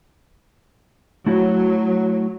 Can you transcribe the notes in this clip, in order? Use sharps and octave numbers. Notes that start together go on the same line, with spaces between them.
F#3 A3 E4 F#4